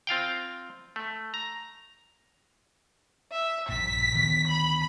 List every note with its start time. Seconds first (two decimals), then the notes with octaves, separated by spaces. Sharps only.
0.07 C4 F4 F5 G5
0.96 A3
1.34 A#5
3.32 E5
3.69 A#1 G2 B6
4.14 D2 D#3 B3
4.48 B5